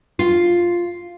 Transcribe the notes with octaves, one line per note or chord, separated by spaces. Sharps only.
F4